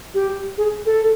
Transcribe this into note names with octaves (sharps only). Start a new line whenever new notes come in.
G4
G#4
A4